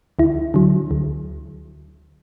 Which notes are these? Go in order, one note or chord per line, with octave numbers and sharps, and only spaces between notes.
D2 E4
D3 F#3
D2